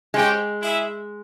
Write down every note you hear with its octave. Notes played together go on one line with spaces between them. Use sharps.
G#3 C#4 G4 C5 G5
E4 G#4 E5